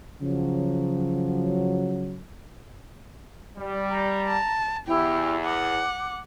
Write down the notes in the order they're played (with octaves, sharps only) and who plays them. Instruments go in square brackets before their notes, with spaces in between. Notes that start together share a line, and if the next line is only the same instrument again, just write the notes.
[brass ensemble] C#3 F3 F#3
G3
[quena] A#5
[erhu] A5
[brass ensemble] E2 [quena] E4 [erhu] G4
[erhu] F#5 [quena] D6